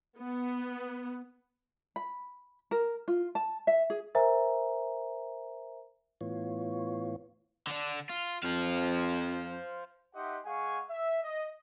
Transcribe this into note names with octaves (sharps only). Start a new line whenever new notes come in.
B3
B5
A#4
F4
A5
E5
G#4
A#4 C5 E5 G#5 A#5
A2 E3 B3 F4 C#5
D3 D4
F4
F2 C5 F5
D#4 G4 D#5 E5 F#5 C6
G#3 G#4 F5 F#5 G#5 C#6
E5
D#5